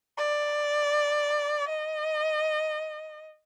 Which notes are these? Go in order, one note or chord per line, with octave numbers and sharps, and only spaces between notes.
D5
D#5